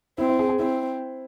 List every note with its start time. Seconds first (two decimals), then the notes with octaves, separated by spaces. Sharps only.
0.18 C4 E4
0.29 E4
0.39 G#4
0.49 G#4
0.59 C4 E4